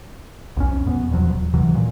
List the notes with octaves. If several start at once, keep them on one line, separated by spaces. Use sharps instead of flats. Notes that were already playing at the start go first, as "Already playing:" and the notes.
B1 F2 C#4
F2 B2 B3
E2 B2 F3 F#3
D#1
D2 C3 E3 F#3
A#2